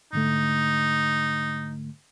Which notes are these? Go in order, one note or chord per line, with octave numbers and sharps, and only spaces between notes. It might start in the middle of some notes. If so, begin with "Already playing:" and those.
G#2 D3 A3 D#4